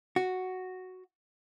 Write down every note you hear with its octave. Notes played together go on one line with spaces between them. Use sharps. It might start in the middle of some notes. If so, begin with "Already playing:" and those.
F#4